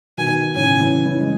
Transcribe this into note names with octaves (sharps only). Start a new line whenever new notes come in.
B2 D#3 G#5
A2 C#3 G#5
C#3 E3
C#3 E3
G#3